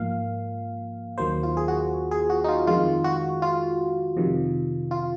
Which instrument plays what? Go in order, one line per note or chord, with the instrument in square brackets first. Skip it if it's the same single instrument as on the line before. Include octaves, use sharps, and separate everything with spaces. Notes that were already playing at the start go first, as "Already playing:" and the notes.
Already playing: [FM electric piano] G#2 F3 A#3 F5
D#2 D#3 F#3 A#3 C5
F4
G#4
F#4
G#4
F#4
D#4
F4
F2 D#3 G#3 F4
F#4
F4
F2 C3 D#3
F4